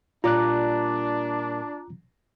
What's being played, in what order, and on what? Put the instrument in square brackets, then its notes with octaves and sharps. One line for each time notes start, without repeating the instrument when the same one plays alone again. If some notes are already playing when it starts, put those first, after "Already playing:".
[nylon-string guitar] A#2 G3 D5 [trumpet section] D4 [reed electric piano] F4 [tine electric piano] A#5 D6 F#6